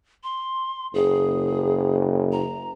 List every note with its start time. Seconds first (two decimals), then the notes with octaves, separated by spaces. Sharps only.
0.23 C6
0.94 F#1 G#4
2.32 A#5